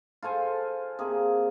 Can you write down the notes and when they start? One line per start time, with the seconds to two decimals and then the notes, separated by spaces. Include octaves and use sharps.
0.22 F4 A4 C5 G#5
0.99 C3 A#3 G#4